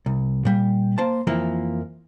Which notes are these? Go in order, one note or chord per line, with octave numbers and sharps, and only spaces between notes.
C2
A#2 G3
A#3 C5 A5
F2 E3 F3 A#3 E4